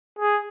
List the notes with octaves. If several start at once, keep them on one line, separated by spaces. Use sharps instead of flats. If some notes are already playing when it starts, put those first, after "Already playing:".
G#4